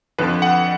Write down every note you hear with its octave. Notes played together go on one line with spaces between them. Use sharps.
F2 D3 F3 B4
F#5